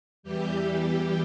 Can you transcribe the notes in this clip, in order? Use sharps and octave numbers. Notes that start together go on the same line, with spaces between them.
E2 E3 G3 G4